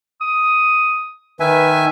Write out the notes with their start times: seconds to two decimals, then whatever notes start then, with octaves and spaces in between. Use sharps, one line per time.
0.21 D#6
1.40 D#3 B4 E5 G#5